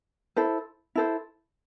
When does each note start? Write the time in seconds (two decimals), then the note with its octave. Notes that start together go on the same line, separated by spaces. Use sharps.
0.36 E4 A4 C5
0.95 E4 A4 C5